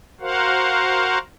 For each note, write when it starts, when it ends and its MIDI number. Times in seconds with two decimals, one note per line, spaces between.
0.21 1.18 66
0.21 1.18 70
0.21 1.18 72
0.21 1.18 77
0.21 1.18 78